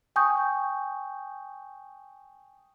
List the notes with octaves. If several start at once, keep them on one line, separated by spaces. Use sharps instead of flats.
G5 G#5 C#6 D#6 G6